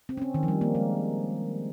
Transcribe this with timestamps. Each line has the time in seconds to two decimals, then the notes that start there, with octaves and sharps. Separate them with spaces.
0.09 C4
0.17 C#4
0.22 C4
0.34 D#3
0.43 F3
0.48 G3
0.61 A#3
0.75 G#3